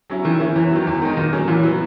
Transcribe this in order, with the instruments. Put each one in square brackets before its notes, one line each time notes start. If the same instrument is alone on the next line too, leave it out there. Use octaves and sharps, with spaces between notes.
[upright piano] F#3 C#4 E4
[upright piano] D#3 [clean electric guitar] E3
[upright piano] A#3 C#4 E4
[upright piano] E2 [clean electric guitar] E3
[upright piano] D#3 F#3
E2
D#3 G#3 D#4
[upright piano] A#2 [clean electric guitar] D#3
[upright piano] F#3 A#3 C#4
[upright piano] A#2 [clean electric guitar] E3
[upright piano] F#3 B3